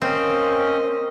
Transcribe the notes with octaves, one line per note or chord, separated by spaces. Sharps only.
A#3 C4 C#4 D#5